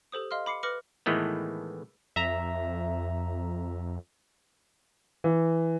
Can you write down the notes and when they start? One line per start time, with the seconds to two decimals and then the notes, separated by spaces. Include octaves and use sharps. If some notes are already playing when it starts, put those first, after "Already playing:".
0.12 G4 A4 C5 D#6
0.31 D#5 F5 C6 F6
0.46 B5 D6 C7 C#7
0.63 B4 D6 F6 A#6 C#7 F#7
1.06 A2 D#3 E3 G#3 A3 B3
2.16 F2 E5 A#5
5.24 E3